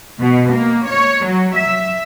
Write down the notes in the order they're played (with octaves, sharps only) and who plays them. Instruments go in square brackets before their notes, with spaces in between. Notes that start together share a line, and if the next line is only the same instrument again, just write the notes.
[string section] B2
A#3
C#5
F#3
E5